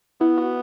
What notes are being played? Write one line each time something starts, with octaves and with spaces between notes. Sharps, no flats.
B3 E4
F#4